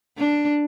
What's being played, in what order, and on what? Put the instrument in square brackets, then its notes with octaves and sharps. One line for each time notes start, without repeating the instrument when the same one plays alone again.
[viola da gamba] D4